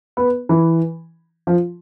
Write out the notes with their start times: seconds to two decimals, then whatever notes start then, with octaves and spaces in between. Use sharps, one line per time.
0.17 B3
0.49 E3
1.47 F3